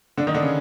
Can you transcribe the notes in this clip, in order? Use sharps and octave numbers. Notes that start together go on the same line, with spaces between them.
D3 D4
D#3 D#4
D3 D4
C#3 C#4